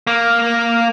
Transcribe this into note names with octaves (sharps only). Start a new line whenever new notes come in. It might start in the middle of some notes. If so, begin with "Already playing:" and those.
A#3